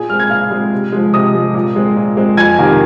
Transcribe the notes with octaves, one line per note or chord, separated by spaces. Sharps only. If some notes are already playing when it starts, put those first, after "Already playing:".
Already playing: A#2 G#4 G#5
G#3 C4 F6
G#6
A#2 F5 F6
G#3 C4
C3
F3 G#3
C3 D#5 D#6
F3 G#3
A#2
G#3 C4
A#2
G#3 C4
F2 G#5 G#6
C3 D#3 A#3